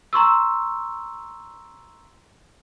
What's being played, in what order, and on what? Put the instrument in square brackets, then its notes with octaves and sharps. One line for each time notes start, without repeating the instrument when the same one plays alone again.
[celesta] A#5 C6 C#6 E6